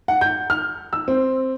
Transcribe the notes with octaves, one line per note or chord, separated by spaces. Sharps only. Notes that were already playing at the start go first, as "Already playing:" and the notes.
F#5
G6
F6
E6
C4